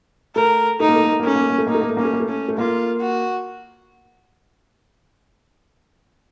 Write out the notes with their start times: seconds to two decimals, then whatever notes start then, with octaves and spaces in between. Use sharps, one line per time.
0.36 A3 A#4
0.80 A3 D#4
0.89 A#3
0.96 A3
1.04 A#3
1.12 A3
1.20 A#3
1.25 A3 C#4
1.36 A#3
1.43 A3
1.50 A#3
1.58 A3
1.67 A#3 D#4
1.75 A3
1.81 A#3
1.90 A3
1.97 A#3 C#4
2.05 A3
2.13 A#3
2.20 A3
2.29 C#4
2.48 A3
2.58 A#3 F4
3.01 F#4